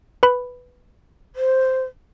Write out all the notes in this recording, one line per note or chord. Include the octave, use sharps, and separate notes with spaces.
B4 B5
C5